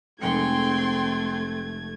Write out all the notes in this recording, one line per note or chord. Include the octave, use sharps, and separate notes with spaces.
F1 G#3 A3 C4 G5 C6 G#6 C#7